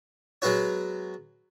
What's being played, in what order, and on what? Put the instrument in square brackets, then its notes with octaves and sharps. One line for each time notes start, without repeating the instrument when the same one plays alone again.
[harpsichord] F#3 G#3 B3 F#4 C#5